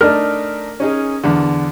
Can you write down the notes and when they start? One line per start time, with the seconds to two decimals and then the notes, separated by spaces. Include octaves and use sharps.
0.01 A3 D4 D#4 A#4 F6
0.80 C#4 D#4 G#4
1.24 E2 D3